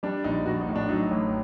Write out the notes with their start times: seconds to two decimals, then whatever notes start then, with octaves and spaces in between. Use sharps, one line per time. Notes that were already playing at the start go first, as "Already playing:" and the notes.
0.03 G3 D4
0.24 A#1 D#4
0.46 A#1 F#4
0.61 D#4
0.68 A2
0.76 D4
0.89 F#3 D#4
1.11 A1